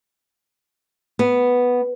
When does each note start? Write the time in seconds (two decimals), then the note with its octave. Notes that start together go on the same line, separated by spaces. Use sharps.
1.19 B3